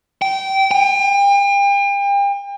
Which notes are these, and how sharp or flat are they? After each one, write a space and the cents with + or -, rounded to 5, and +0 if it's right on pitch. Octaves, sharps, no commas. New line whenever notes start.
G5 -20
G5 +40